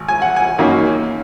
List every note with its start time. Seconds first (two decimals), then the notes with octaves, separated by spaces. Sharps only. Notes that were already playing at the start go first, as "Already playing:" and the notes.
Already playing: G#1
0.08 G#5
0.22 F#5
0.36 G#5
0.59 F#2 D#3 A#3 C#4